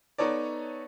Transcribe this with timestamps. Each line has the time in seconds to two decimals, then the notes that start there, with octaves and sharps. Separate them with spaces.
0.18 B3 D#4 A4 C#5 D5